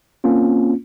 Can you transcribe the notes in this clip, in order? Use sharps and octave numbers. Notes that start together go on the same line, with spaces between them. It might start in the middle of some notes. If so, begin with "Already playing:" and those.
A#3 C4 C#4 F4